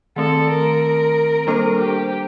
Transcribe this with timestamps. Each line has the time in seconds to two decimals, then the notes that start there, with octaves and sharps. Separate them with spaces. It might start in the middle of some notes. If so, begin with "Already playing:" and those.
0.16 D#3 A3 C4 A4
0.50 A#4
1.47 G3 A#3 D4 A4 A#4 C5
1.80 G4